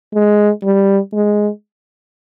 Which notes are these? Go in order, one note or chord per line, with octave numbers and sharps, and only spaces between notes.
G#3
G3
G#3